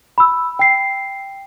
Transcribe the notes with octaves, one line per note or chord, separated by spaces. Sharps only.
B5 E6
G5 C7